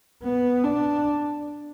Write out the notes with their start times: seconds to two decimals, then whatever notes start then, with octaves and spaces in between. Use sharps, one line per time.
0.23 B3
0.64 D4